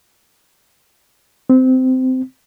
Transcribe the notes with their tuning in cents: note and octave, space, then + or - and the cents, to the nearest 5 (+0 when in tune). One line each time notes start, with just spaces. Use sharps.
C4 -20